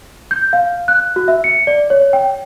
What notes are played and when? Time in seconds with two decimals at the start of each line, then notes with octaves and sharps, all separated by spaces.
0.31 G6
0.53 F5
0.88 F#6
1.16 F#4
1.28 E5
1.44 C#7
1.67 D5
1.90 C#5
2.13 G5